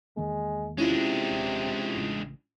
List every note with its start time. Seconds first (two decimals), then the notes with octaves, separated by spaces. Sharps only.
0.17 E2 D#3 G#3 A#3
0.78 C3 G#3 C#4 D4 E4 F4
1.31 D#1
1.95 A1 A2 C#3